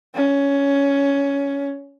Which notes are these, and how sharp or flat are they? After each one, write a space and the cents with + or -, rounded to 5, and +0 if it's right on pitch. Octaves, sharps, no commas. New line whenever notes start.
C#4 +10